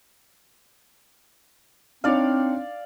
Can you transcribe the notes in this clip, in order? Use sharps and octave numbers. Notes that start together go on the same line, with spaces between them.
C4 D4 D#4 C#5 D5 F5